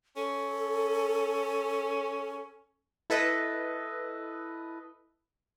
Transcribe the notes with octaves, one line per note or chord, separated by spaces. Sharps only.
C#4 A4
E4 A4 B4 D#5